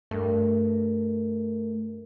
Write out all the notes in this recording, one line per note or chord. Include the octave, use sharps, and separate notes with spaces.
G2 A3 A#4